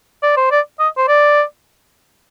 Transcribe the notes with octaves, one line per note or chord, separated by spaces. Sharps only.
D5
C5
D5
D#5
C5
D5